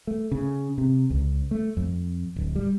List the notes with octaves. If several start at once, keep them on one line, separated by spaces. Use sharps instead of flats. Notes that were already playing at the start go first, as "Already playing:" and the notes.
A3
C#3
C3
C#2
A3
F2
D1
G3